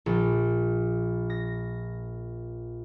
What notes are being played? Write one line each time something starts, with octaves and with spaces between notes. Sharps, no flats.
A#1
A#6